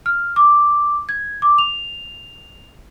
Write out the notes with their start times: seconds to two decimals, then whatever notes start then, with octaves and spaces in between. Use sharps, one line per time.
0.06 F6
0.36 D6
1.09 G#6
1.42 D6
1.58 F7